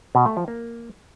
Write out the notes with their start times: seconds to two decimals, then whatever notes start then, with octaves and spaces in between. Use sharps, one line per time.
0.15 B2
0.26 A3
0.37 F3
0.48 A#3